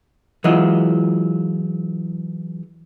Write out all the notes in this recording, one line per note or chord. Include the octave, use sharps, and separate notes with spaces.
E3 F#3 G#3 E4 F4 D#5